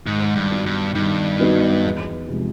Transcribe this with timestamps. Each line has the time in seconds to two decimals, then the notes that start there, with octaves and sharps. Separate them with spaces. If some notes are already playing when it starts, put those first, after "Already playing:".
0.05 G#2 D#3
0.35 G2
0.51 F#3 B3 D#4
0.66 G2
0.95 G2 D#3
1.39 F#3 B3 D#4
1.85 E2
2.28 C3 F3 G#3